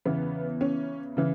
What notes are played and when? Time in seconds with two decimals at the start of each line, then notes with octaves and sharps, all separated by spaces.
0.05 E2 C#3 E3 B3
0.61 C#4
1.17 C#3 E3